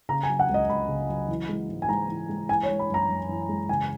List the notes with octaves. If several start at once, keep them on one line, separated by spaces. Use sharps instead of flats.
C#3 A#5
G#5
F#3
F#5
C#2 D#5
C#2 B5
C#3
F#3
E3
G#3
G#2
G#5
G#2 A#5
E3
G#3
E3 G#5
C#5
G#3
B5
F#2 A#5
F#2
E3
G#3
C#3 G#5